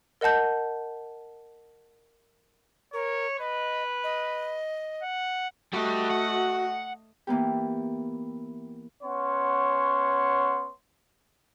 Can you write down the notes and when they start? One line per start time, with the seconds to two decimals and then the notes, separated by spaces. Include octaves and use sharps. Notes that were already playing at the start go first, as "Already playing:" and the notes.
0.21 A#4 D#5 F#5 A5 G6
2.93 A#4 C#5
3.39 B4 D#5
4.04 D#5
5.03 F#5
5.73 G3 A3 F#4 G4 D#5
6.11 F#5
7.27 E3 A#3 B3 G4
9.03 B3 C#4 C#5 F#5 C6